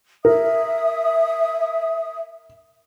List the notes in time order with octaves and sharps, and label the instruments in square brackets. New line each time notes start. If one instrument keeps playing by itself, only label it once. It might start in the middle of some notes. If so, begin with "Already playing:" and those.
[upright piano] A#4 [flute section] E5 D#6